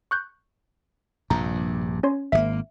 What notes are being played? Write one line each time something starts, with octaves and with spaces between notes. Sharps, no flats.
C#6 F#6 G6
A#1 G2 C3 A#5
C#4 C#5 C6
G#1 D#3 A#3 E5